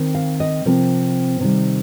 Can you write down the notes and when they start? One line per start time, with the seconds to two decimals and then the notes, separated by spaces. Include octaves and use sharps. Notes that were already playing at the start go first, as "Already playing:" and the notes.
Already playing: D#3 C4
0.15 F5
0.40 D#5
0.65 C3 F3 C4 A#4
1.40 C3 D#3 G3